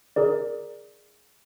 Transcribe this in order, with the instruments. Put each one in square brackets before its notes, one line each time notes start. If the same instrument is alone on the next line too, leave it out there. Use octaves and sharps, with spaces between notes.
[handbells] G#4 A#4 D5